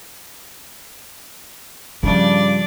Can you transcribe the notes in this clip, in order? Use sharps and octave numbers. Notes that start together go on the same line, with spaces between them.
G2 C#3 F3 D4 D5